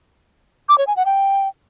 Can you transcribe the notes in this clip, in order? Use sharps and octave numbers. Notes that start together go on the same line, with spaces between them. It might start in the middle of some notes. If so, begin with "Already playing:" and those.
D6
C#5
G#5
F#5
G5